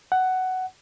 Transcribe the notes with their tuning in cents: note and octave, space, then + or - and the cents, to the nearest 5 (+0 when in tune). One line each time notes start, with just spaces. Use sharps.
F#5 +10